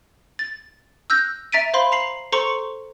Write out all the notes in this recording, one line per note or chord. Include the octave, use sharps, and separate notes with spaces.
A6
E6 F#6 G6 A#6
E5 A#5 A6 B6 D7 D#7
C5 F5 B5 C6
A#5 C7 F#7
A4 C5 A#5 C6 C#6 C#7